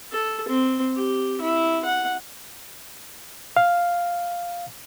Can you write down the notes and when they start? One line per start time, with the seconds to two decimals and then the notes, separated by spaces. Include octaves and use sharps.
0.12 A4
0.48 C4
0.96 G4
1.41 E4
1.85 F#5
3.57 F5